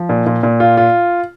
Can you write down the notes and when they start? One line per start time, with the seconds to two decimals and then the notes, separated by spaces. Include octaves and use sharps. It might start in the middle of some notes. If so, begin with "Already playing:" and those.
Already playing: F3
0.09 A#2
0.26 A#2
0.43 A#2
0.60 F4
0.77 F4